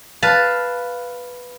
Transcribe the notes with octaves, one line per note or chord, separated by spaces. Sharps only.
B4 F5 A5